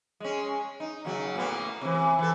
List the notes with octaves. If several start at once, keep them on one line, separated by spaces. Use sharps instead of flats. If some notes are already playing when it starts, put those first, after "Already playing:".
G#3 C#4
D#4
D#2 C#3 F#3
A2 A#3 B3
C3 E3
E3 A4